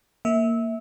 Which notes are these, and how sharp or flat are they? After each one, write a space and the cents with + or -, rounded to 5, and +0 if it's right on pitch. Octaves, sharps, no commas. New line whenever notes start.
A#3 -10 E5 -20